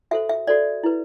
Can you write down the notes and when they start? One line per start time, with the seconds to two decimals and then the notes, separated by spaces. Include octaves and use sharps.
0.11 F#4 A4 C5 E5
0.29 E5
0.47 F#4 A4 C5 D5
0.83 E4 B4